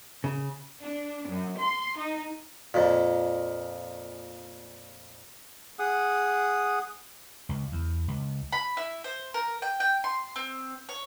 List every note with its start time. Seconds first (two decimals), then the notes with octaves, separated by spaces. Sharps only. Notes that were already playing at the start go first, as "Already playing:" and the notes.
0.24 C#3
0.81 D4
1.28 F#2
1.58 C6
1.98 D#4
2.74 F2 A#2
5.79 G#4 F#5 D#6
7.49 C#2
7.72 E2
8.08 C#2
8.52 B5
8.77 E4
9.04 C5
9.34 A#4
9.62 G5
9.80 G5
10.04 C6
10.36 C4
10.89 C#5